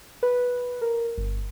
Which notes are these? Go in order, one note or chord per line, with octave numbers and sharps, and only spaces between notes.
B4
A#4
G1